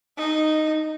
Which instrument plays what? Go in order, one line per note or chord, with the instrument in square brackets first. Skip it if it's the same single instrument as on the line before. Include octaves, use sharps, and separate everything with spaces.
[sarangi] D#4